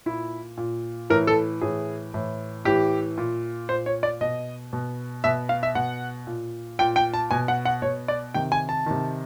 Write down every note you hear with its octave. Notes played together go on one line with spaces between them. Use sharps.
A#2 E4
A#2
A2 E3 A#4
A4
A2 E3 G#4
A2 E3
A2 E3 G4
A#2
A#2 C5
C#5
D5
B2 D#5
B2
B2 E5
F5
E5
B2 F#5
A#2
A#2 G5
G5
A5
B2 G#5
F#5
F#5
B2 C#5
D5
C3 D#3 G5
G#5
A5
C3 D#3